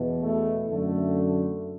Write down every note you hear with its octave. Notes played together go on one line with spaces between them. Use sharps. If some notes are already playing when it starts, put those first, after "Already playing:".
Already playing: E2 B2
A3
F#2 D3 A3